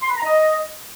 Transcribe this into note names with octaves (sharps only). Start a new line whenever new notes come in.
C6
B5
A#5
D#5